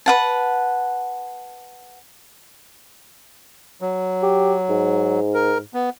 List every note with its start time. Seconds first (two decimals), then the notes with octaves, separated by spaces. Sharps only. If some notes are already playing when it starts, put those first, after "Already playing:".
0.06 B4 F#5 A5
3.81 F#3
4.23 G4
4.69 G#2
5.34 A#4
5.74 B3